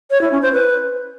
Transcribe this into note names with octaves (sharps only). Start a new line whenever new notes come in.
C#5
E4
C#4
C5
B4